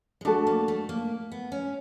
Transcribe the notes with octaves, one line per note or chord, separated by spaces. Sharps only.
G#3
A3 D4 F#4 A4
A#3
A3
A#3
B3
C#4